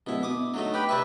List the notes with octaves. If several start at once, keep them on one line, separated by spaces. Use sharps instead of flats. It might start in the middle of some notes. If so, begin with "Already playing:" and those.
D1 B2 E4
B2 D6 D#6
D2 F#3 A3 D#4
G4 B4 G5 B5
C3 B4 D5 E5 C#6